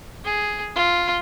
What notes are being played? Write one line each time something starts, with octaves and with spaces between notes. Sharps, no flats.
G#4
F4